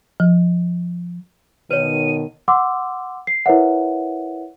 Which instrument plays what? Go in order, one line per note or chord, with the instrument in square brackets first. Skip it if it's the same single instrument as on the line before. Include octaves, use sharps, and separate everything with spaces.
[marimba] F3
[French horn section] B2 D#3 [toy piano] B4 C#5 [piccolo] D#7
[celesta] F#5 C6 D6 E6
C7
E4 A#4 B4 C#5 E5 F#5